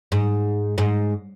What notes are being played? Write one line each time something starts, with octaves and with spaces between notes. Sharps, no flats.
G#2
G#2